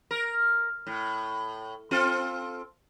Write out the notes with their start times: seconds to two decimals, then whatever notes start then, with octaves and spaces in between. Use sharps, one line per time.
0.11 A#4
0.87 A2
1.91 C4 F4 A4